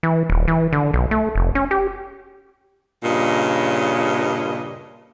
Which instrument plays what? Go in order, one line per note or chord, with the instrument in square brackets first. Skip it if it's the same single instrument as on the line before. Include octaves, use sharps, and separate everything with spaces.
[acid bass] E3
D#1
E3
D3
B1
A3
F1
C#4
G4
[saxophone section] G2 A#2 C#3 D#5